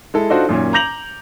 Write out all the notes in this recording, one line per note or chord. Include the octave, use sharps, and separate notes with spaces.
G#3 E4 A4
D4 D#4 F4 F#4 A4 C5
F#2 A#2 D#3 C#4
A#5 D6 G6 A#6 F7 F#7